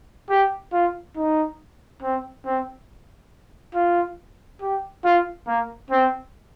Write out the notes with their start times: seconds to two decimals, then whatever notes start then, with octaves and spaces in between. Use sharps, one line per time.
0.30 G4
0.72 F4
1.16 D#4
2.02 C4
2.45 C4
3.75 F4
4.61 G4
5.04 F4
5.47 A#3
5.90 C4